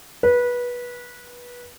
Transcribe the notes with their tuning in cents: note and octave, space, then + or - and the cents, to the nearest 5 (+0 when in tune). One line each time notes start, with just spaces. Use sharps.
B4 -20